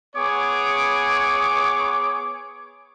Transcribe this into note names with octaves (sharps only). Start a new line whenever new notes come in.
B3 G#4 C#5 D6